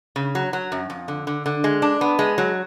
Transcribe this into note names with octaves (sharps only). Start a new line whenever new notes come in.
C#3
F#3
F#3
F#2
F2
D3
D3
D3
G#3
D4
B3
G#3
F#3